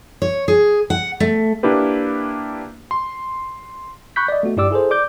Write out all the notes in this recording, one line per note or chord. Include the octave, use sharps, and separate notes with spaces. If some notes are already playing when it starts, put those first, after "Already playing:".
C#5
G#4
F#5
A3
A#3 D4 E4 G4 B4
C6
B5 C#6 F#6 G6 B6
D5 D#5
A3 B3 F#4
G2 E4 G4 D5 D6 E6
E4 G#4 A4 C5
D5 D6 G6